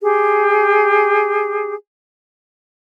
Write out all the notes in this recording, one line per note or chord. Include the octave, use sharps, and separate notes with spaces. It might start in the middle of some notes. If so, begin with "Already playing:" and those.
G4 G#4